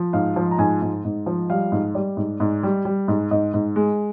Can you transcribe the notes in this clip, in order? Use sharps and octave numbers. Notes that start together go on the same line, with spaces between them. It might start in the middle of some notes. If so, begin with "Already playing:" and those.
Already playing: F3
G#2 F5
F3
A#5
G#2 G#5
G#2
G#2
F3
G3 F5
G#2
G3 D5
G#2
G#2
G3
G3
G#2
G#2 D#5
G#2
G#3